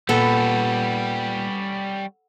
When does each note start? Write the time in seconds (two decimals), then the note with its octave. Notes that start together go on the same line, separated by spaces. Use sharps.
0.09 A#2 G3 B3 C#4 A4